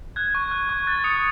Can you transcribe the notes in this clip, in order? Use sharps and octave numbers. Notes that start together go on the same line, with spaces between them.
F#6 G#6
C#6
F#6
C#6
F#6 A6
D#6 C#7